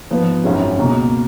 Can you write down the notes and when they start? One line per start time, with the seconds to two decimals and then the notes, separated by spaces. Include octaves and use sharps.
0.10 G#2 F3 B3
0.44 G#1 F#2 D#3 G#3 C#4
0.77 C#2 B2 A#3